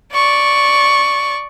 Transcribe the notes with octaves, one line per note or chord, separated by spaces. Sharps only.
D5 C#6